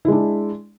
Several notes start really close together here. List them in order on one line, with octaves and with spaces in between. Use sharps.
E4 G#3 D4